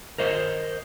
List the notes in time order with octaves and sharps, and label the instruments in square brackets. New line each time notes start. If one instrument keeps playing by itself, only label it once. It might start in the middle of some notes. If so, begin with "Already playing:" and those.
[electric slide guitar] A#4 C5 D#5